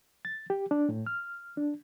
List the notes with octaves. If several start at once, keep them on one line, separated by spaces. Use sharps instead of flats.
A6
G4
D4
A2
F6
D4